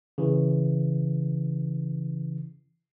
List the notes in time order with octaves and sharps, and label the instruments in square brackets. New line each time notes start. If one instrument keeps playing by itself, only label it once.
[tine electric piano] C#3 E3